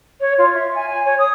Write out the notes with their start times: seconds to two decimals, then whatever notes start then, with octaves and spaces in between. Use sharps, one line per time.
0.21 C#5
0.38 F4
0.54 E5
0.74 G#5
0.89 G#5
1.05 C#5
1.19 D#6